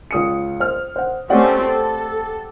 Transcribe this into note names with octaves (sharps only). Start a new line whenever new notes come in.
C#2 D#6 C#7
C5 F6
C5 F#5
A3 C4 C#4 G4 D5 F#5
A4